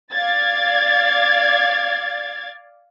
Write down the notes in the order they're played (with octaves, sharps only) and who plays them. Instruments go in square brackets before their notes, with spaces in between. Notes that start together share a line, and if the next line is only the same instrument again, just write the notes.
[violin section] D5 F5 G#6 A6